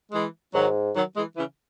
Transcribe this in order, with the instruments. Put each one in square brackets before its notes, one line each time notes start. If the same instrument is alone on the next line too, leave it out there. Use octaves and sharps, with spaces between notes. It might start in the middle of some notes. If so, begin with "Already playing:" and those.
[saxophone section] E3 G#3
[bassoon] G#2 [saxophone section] D#3 F#3
[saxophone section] D#3 F#3
E3 G#3
C#3 E3